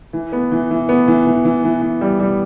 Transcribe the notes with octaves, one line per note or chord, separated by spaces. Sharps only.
E3
B3
E3
E3
B3
E3
E3
E3
E3
E3
G3
G3